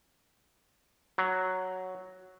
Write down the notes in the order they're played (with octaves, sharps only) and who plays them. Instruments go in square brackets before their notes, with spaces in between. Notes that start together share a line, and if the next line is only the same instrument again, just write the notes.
[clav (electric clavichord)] F#3